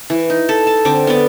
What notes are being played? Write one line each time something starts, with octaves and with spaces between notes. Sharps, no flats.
E3
D#4
A4
A5
D3 C4 D6
B3 D5